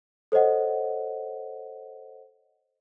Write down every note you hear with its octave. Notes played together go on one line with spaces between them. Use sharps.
A4 C5 C#5 D#5 F#5